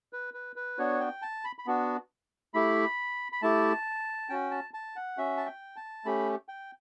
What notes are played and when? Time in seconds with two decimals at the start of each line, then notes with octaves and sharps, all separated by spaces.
0.13 B4
0.34 B4
0.56 B4
0.78 B3 D4 F#4 C#5
1.01 G5
1.22 A5
1.45 B5
1.59 B5
1.66 B3 D4 F#4
2.54 A3 E4 G4 B5
3.32 B5
3.42 A3 E4 G4 A5
4.29 C#4 F#4 G5
4.51 A5
4.74 A5
4.96 F#5
5.17 C#4 F#4 E5
5.37 A5
5.46 G5
5.76 A5
6.05 A3 C#4 G4 B5
6.48 G5